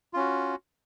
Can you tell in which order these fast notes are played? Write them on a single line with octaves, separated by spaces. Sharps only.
F4 C#4 F#4